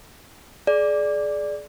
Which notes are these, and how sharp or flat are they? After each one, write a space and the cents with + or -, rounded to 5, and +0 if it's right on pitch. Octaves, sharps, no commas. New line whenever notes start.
G#4 +30 D5 +0